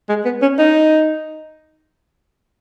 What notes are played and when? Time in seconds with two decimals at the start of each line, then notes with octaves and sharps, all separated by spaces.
0.09 G#3
0.25 B3
0.42 C#4
0.58 D#4